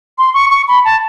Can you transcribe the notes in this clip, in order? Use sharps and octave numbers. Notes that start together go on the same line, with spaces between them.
C6
C#6
C#6
B5
A5